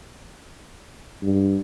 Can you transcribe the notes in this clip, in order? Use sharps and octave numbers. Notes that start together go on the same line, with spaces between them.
G2